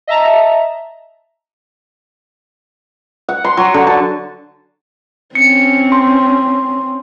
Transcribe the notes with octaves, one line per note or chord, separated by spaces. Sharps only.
D#5 E5 A5 A#5
F#5
C6
F#3
D3
A5
C4 C#4 C#7
C6